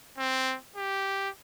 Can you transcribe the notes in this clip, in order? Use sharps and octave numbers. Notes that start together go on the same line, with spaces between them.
C4
G4